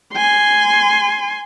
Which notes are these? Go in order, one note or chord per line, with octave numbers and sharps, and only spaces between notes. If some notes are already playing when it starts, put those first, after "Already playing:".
G#5 C6